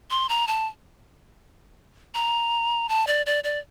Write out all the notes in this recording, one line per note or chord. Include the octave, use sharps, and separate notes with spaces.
C6
A#5
A5
A#5
A5
D5
D5
D5